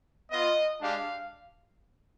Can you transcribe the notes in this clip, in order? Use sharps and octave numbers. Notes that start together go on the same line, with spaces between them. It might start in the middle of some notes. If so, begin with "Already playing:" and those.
B3 F4 D#5
G#3 D4 G4 F5